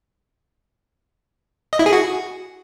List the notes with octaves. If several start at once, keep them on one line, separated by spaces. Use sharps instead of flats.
D#5
E4
G#4
F#4